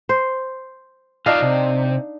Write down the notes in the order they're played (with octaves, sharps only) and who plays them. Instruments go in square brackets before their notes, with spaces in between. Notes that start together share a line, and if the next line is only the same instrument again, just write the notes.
[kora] C5
[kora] D4 D#4 F5 [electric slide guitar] F4 D#5 A5
[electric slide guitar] C3